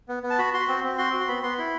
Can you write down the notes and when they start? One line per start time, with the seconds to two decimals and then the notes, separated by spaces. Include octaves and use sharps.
0.08 B3
0.23 B3
0.30 A5
0.39 F#4 B5
0.54 F#4 C6
0.68 C4
0.84 C4
0.98 F#4 C6
1.13 F#4
1.21 C6
1.28 B3 B5
1.43 B3 C6
1.58 E4 B5